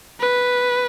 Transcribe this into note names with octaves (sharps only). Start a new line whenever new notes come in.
B4